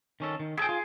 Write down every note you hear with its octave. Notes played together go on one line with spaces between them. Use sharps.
D#3 C#4 A4
D#3
E4 G#4 A4 G5
F4